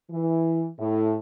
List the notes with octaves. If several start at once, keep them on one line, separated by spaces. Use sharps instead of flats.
E3
A2